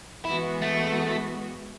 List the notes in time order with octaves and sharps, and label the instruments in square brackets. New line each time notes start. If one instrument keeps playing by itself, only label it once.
[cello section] E3 G#3 B3 F#4 [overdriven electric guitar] E4
[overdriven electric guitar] A3